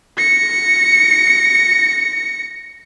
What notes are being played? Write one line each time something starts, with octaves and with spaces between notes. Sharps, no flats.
A#6 C#7